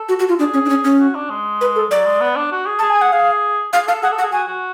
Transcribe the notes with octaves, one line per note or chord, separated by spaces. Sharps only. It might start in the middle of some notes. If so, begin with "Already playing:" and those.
Already playing: A4
F#4
F#4
F4
D4 G#4
C#4
D4
C#4
C#4
F#4
D4
G#3
B4
A4
F#3 D5
G#3
B3
D4
F#4
G#4
G#4 A5
G#5
F#5
G#4 F5
G#4 F5
A4 F5
G#4 F#5
A4
F#5
G#4
F#4 G#5
F#4